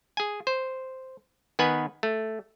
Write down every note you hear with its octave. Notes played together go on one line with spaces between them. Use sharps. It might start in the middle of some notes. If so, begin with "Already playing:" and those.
G#4 G#5
C5
D#3 B3 B4 G#5
A3